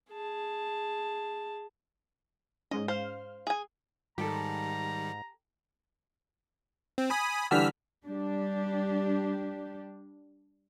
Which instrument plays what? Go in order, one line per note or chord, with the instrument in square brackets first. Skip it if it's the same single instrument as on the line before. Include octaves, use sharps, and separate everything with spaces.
[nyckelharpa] G#4 A5
[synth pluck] G#2 G#3 C#4 [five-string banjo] D#5
[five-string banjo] C5 [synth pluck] F5 F6
[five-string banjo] G#4 G#5
[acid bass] G#2 [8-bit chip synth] D#3 G3 [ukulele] G4 A4 [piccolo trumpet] A#5
[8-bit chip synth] C4
G#5 B5 D#6
[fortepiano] D3 E3 G3 [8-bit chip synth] E6 F6 B6
[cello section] G3 D4 G4